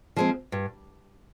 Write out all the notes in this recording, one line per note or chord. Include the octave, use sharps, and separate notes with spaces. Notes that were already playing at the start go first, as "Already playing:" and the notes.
F3 G#3 C4
G2